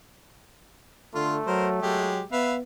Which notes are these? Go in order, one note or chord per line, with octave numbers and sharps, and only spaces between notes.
D3 A3 F4 C6
F#3 A#4 C5
F#3 G#3 G4
B3 B4 E5 F5